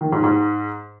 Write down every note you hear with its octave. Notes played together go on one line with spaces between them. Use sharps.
D#3
G#2
G#2